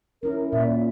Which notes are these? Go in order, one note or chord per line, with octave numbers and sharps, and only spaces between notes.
C#4 E4 A#4
A#2 D5 E5